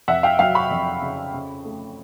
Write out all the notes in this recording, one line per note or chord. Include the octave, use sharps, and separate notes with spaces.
F2 E5 F#5
F5 G5
F#3 F5 G5
B5 C#6
F2
C#3
C#3
A3